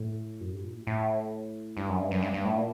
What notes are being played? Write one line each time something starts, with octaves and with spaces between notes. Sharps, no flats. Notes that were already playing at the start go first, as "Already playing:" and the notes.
Already playing: A2
F#2
G2
A#2
A2
A2
G2
F#2
G2
F#2
G2
G2
A2
A#2